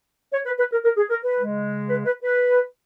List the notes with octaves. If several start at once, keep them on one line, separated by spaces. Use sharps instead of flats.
C#5
B4
B4
A#4
A#4
G#4
A#4
B4
C#3 G#3
B4
B4
B4